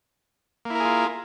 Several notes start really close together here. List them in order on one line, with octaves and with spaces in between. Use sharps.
A#3 E4 A#4 G#4 F4